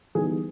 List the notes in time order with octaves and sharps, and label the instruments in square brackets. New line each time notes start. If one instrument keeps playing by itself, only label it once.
[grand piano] E3 G3 B3 D#4 G#4